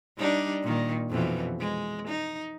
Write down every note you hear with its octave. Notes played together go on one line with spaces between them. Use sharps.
G3 D4 D#4
A#2 D#3
F2 B2 E3
G#3
D#4